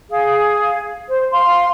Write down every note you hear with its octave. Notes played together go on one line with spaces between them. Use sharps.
G#4 F5
C5
F5 C6